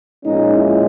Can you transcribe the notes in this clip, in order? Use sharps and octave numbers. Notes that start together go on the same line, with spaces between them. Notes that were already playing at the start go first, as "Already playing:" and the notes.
A#2 F3 G#3 C#4 D#4
E4